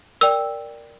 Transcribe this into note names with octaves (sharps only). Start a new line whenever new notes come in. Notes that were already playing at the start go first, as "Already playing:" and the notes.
A#4 D5 G5 E6